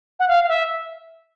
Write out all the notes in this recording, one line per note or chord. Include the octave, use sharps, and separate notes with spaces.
F#5
F5
F5
E5